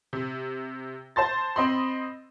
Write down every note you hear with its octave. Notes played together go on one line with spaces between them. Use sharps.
C3
C5 A5 C6 A6
C4 D#5 B5 C6